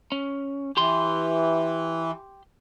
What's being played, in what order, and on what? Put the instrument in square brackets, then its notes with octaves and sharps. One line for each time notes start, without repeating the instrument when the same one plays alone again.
[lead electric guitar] C#4
[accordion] E3 [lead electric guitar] G4 C6